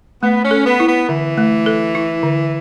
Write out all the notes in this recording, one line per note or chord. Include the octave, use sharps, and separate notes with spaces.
A3 B3
C#4
A4
B3
E4
B3
D3 E3
A3
A4
E4
D3